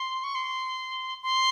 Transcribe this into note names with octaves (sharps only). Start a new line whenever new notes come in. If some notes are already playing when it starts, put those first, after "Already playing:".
Already playing: C6
C#6
C6
C6